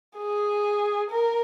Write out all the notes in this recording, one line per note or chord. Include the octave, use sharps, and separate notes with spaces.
G#4
A#4